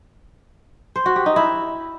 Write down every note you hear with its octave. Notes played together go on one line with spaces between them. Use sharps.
C5
F#4
G4
D#4
E4